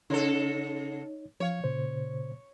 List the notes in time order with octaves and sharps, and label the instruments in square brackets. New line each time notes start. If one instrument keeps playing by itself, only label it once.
[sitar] C#3 A4 [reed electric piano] D#4 C#5
[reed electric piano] F3 F5 [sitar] C#5
[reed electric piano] A#2 C#3 C5